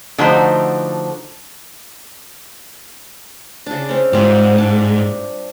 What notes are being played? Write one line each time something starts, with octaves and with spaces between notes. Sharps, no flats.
D3 F3 A3 D#4 F#4 C5
C#3 D4
C4 C#4
G#2 G3 C4 F4
D4